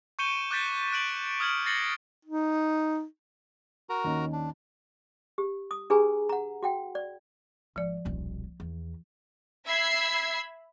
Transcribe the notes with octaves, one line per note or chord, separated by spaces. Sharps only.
C#6 G6 C#7 D#7 E7 G7
D6 F#6 G6 A6 B6 C#7
F#6 D7 F#7
D#6 F6 G#6 D7 F#7
A6 A#6 C7 C#7 F#7 G7
D#4
F#4 A#4 A#5
D#2 D#3 C#4
D4
G4
D#6
D4 G4 G#4 B4 G#5 A#5
F#5 A#5
F#4 F#5 G5
D5
G#1 F3 D5
D#1 B1
E2
E5 B5 E6 G#6 C7